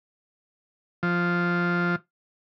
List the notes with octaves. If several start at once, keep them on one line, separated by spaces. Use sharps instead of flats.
F3